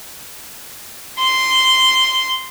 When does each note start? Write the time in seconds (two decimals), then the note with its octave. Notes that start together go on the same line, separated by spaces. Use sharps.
1.19 C6